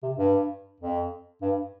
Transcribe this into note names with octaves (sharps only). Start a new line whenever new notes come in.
C3
G2
F2
G2